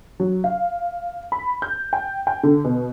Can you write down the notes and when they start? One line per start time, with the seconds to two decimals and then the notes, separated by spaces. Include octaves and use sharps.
0.20 F#3
0.44 F5
1.32 B5
1.62 G6
1.93 G5
2.27 G5
2.43 D3
2.65 B2